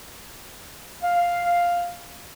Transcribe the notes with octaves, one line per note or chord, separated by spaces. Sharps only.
F5